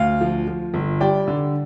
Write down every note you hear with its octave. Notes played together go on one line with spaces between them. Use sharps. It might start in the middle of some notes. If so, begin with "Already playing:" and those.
Already playing: D2 F5
F3
F3
G1
G3 D5 G5
D3